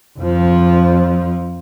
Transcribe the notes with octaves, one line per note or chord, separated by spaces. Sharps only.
F2 F3